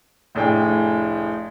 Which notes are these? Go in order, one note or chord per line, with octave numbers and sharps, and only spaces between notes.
F1 A2 D4 G#4 G5